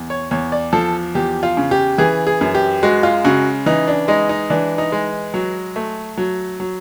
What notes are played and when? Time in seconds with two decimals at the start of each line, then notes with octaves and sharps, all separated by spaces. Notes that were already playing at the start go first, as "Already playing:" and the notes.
Already playing: E2
0.10 C#5
0.31 E2 C#5
0.52 D5
0.73 F3 A4
1.15 E2 G4
1.43 F4
1.57 C#3
1.71 G4
1.98 E3 G#4
2.27 G#4
2.41 F#2
2.55 G4
2.83 G#3 F#4
3.03 F4
3.24 C#3 F#4
3.66 E3 D#4
3.88 D4
4.08 G#3 D#4
4.29 D#4
4.50 E3 D4
4.78 D#4
4.92 G#3
5.34 F#3
5.76 A3
6.18 F#3
6.60 F#3